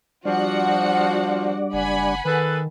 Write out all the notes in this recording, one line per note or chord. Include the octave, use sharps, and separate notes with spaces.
F3 G3 D4 F#4 D5 F#5
F#1 F#5 G#5 B5
D#3 G#4 A4 B4